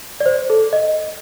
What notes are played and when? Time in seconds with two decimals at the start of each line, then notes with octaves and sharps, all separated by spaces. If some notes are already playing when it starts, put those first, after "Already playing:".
0.20 D5
0.26 C5
0.50 A4
0.73 D#5